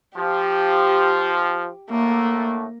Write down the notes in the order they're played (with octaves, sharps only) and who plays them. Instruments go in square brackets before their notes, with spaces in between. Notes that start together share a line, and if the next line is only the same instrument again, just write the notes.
[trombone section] F3 [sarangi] G4
[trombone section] A2 D3 A3 [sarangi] A#3